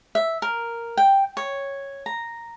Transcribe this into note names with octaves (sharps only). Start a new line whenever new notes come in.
E5
A#4
G5
C#5
A#5